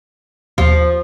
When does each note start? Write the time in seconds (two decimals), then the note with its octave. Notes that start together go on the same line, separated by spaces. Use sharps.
0.58 D#2 F3